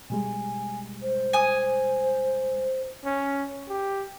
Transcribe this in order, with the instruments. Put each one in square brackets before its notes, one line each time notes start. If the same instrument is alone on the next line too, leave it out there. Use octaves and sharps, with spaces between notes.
[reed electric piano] B2 G3 G#3 [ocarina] G#5
[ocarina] C5
[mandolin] G#5 D#6
[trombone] C#4
G4